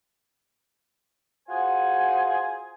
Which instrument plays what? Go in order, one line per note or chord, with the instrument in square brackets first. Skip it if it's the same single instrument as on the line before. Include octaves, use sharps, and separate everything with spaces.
[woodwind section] F4 F#4 G#4 C5 G#5